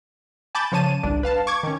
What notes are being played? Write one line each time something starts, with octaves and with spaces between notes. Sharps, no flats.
G#5 A5 B5 D6 G6 A6
C#3 F3 C#5 A5 D#7
G1 C2 G2 D4
B4 F5 A5
C#6 D6 G#6
D#3 C#4